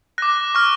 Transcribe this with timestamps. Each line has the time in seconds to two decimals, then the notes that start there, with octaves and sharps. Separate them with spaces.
0.18 D6 F#6 A#6
0.55 C#6 F6